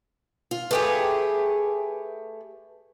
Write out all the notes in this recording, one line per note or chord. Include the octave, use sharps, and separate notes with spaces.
F4
A3 G4 G#4 B4